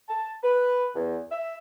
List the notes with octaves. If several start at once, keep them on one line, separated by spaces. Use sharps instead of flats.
A5
B4
E2
E5